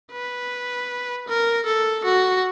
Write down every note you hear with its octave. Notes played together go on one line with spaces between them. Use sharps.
B4
A#4
A4
F#4